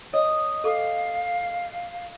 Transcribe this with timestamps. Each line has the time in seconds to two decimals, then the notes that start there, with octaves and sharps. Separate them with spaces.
0.13 C#5 D#5
0.64 A4 F5 D6